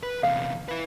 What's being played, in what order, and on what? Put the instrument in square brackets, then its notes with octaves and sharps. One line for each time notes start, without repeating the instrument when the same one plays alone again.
[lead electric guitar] B4
[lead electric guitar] E2 C3 [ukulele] F5
[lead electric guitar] E4 B4